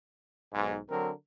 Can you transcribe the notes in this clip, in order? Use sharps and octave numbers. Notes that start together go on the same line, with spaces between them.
B1 G#2
D3 F#3 C4 A#4